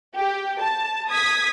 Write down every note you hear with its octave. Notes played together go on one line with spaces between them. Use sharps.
G4
A5
D#6 G#6 B6